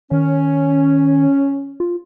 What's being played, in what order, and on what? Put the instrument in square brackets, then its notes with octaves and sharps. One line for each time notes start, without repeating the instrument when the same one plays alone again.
[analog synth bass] D#3 [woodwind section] C#4
[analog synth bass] F4